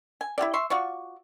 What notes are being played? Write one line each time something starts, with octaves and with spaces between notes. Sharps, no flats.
G#5
E4 F4 G4 D5
E5 C6 C#6
F4 F#4 D5 C#6